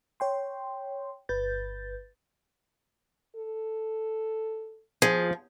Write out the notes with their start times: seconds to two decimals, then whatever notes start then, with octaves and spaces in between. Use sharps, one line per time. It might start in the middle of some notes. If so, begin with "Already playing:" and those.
0.20 C#5 G5 C6
1.29 G1 B4 G6 A6
3.36 A4
5.02 F3 G#4